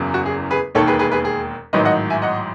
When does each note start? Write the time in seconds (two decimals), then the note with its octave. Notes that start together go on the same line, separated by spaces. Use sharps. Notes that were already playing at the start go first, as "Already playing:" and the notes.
Already playing: F#1 E2 C#3 F#3
0.14 F#4
0.26 G#4
0.51 G#4 B4
0.75 E1 D#2 D#3 A4 C#5
0.87 G#4 B4
0.99 G#4 B4
1.12 G#4 B4
1.25 G#4
1.73 A1 G#2 D#3 F#3 B4 D#5
1.85 D#5 F#5
2.10 E5 G#5
2.22 D#5 F#5